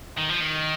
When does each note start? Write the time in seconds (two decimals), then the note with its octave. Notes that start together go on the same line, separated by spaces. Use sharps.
0.18 D#3
0.29 F3
0.40 D#3